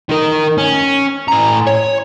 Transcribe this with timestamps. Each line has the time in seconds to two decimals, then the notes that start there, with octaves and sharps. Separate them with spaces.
0.09 D#3 A#4
0.58 C#4
1.28 A2 A#5
1.67 C#5